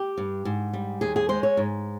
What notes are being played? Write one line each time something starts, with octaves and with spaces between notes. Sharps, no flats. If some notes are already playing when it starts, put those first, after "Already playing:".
Already playing: G4
G2
G#2
G3
D#2 G#4
G#4
G#3 C5
C#5
G#2